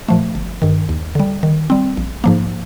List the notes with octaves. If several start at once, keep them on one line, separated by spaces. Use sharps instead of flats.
A#2 F3 A3
G1
G2 D#3
D#2
D3 G3
D#3
G3 C4
A#1
G#2 F3 A#3